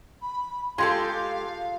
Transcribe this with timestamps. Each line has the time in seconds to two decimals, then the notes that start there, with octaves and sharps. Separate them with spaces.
0.22 B5
0.78 G#3 F4 G4 A4 F5 C6